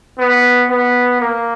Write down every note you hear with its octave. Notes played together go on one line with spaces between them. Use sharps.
B3
B3
A#3